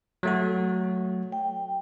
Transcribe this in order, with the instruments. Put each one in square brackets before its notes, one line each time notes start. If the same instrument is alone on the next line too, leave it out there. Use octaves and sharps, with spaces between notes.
[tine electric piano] F#3 A3 F#4
[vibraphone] G5